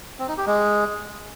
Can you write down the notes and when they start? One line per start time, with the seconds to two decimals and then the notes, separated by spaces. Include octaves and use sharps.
0.19 C4
0.28 D#4
0.37 G4
0.47 G#3